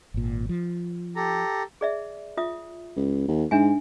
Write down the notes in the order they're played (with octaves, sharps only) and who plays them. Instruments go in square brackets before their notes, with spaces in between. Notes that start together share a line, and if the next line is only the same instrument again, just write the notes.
[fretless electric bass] G#1 A#2
F3
[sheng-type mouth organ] G4 A4 A#5
[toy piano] G#4 D5 E5
F4 E5 D#6
[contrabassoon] C#2
D#2
[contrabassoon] G#2 [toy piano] D4 E5 G#5